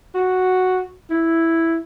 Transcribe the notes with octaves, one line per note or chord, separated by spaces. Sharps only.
F#4
E4